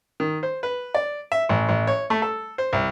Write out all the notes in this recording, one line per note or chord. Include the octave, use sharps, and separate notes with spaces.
D#3
C5
B4
D5
E5
A1
A1
C#5
A3
A4
C5
C2